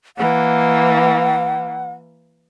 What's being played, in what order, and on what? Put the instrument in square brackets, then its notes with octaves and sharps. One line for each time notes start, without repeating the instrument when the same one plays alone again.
[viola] E3 A#3 [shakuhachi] F#5